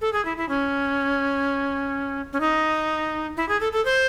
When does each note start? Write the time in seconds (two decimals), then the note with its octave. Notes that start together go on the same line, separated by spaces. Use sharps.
0.01 A4
0.13 G#4
0.25 E4
0.37 E4
0.49 C#4
2.33 C#4
2.40 D#4
3.37 E4
3.49 G#4
3.61 A4
3.73 A4
3.85 C5